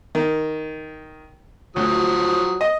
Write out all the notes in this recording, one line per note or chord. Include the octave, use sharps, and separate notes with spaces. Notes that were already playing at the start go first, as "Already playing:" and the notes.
D#3
D2 F3 F#3 D#6
D#5